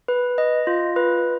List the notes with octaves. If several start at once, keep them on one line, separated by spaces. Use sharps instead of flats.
B4
D#5
F4
B4